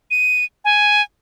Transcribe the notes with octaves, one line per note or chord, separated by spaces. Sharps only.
D#7
G#5